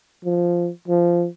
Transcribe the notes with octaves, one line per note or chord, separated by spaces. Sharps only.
F3
F3